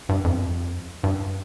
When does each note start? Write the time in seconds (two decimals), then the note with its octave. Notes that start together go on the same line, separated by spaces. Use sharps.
0.09 G2
0.24 F2
1.04 G2